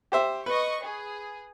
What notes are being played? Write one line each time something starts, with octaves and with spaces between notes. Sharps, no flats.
G4 C5 E5
B4 D#5 C#6
G#4